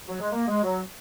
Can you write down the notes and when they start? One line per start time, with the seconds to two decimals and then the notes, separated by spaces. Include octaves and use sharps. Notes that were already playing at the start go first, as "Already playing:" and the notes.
0.09 F#3
0.20 G#3
0.33 A#3
0.48 G#3
0.63 F#3